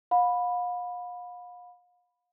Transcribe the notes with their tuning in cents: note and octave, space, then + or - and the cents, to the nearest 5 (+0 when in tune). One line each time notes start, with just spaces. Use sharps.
F5 +40 B5 +0